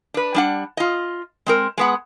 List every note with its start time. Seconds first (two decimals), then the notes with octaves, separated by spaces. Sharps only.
0.14 D4 B4
0.34 G3 D4 F#5
0.77 F4 D#5
1.46 G#3 C4 A#4
1.78 G#3 B3 F#5